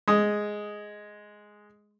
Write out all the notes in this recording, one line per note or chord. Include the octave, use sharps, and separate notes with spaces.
G#3 D#6